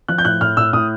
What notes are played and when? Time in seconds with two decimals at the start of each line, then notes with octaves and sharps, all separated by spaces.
0.08 F3 F#6
0.18 G6
0.25 A2 F#6
0.41 A2 F6
0.57 A2 E6
0.73 A2 D#6